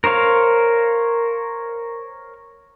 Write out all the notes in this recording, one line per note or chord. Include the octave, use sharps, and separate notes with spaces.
A#4 C5 C#5 F5